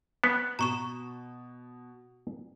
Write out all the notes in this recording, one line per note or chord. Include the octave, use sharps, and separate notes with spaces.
B3
B2 A#5 C#6 E7